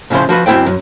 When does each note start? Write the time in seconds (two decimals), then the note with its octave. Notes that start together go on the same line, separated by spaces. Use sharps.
0.10 A2 C#3 F3 E4 C5
0.29 F3 F#4 B4
0.46 F#2 C4 E4 A4 C5 G5
0.66 F#2